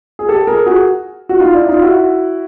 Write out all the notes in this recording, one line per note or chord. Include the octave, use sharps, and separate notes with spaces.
G#4
G4 A4
G#4 A#4
F#4 G#4
F#4
D#4 F4
D4 E4
D#4 F4
E4 F#4